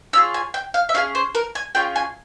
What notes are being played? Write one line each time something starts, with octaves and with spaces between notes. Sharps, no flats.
C#4 F4 G#4 E6
G#5
G5
F5
E5
C#4 F4 G#4 F5
C5
A#4
G#5
C#4 F4 G#4 G5
G#5